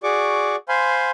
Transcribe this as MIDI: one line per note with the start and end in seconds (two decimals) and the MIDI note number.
0.03 0.56 66
0.03 0.56 68
0.03 0.56 74
0.03 0.56 85
0.03 0.56 86
0.69 1.11 72
0.69 1.11 77
0.69 1.11 80
0.69 1.11 83
0.69 1.11 84